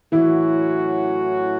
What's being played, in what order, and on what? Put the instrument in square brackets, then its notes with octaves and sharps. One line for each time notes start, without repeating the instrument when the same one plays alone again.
[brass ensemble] A2 F#3 C#4 F#4 [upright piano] E3 E4